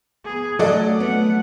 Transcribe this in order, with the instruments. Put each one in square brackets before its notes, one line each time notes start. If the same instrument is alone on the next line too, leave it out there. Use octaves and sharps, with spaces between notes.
[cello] B3 G#4
[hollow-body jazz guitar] F#3 [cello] A3 [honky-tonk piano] A4 D5 D#5
[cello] A3 F#5 [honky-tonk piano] B3